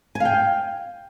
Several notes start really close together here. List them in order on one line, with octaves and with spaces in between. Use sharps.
G#5 F5 G5